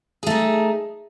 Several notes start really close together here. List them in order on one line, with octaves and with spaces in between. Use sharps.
G#4 A3 D#4